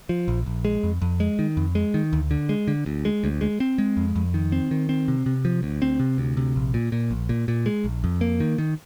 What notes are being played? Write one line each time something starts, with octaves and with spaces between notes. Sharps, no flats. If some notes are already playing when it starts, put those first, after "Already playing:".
F3
A#1
A#1
G#3
F2
F2
G#3
D#3
F2
G#3
D#3
D2
D3
G#3
D3
D2
G#3
D2
G#3
C4
G#3
F2
F2
D#3
C4
D#3
C4
C3
C3
F3
D2
C4
C3
D2
C3
A#1
A#2
A#2
A#1
A#2
A#2
G#3
A#1
F2
A#3
D#3
D#3